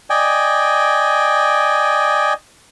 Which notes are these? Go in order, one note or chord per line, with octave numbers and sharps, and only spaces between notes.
D5 D#5 G5 G#5